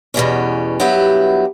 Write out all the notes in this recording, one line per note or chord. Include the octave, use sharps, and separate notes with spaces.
E2 B2 G3 C#4
G2 F#3 B3 E4 G4